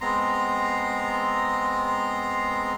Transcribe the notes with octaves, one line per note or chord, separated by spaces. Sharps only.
G#3 B3 C4 A#5 C6